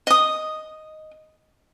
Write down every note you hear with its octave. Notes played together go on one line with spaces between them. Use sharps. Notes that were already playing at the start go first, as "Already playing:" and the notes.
D#5 D#6